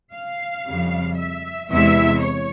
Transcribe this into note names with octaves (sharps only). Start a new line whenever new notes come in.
F5
F2 C#3 G3
E5
E2 C3 E3 G#3 E4 E5
C#5